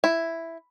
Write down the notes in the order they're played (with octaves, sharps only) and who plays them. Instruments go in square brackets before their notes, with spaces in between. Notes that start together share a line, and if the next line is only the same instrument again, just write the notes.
[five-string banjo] E4